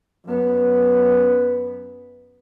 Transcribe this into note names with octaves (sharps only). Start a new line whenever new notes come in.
F#2 B3